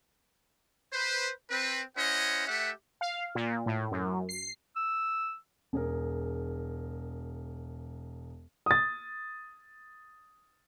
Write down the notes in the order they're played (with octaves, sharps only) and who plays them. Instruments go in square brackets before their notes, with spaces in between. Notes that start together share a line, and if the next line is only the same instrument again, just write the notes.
[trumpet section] B4 C5
C4 B4
C#4 E4 C5 D#5 F#5
A3 G4 E5 F#5
[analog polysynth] F5
A#2
A2
F#2
C7
[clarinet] E6
[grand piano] E1 G#4 A#4
D#6 A6